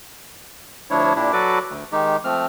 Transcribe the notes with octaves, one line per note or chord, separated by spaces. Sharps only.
D2 F3 D4 E4 C#5
A#2 D4 E4 G4
F#3 F#4 A4 B4 D5 D6
D2
D#3 G#3 D#4 G4
F3 A3 C4 F6